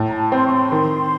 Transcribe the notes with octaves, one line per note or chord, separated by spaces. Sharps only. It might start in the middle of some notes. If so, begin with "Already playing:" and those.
Already playing: A2
A#5
A5
C4 C6
C#6
C6
D#3